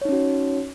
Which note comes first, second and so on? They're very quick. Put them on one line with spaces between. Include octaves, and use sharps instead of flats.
C#5 D#4 C#4 F#4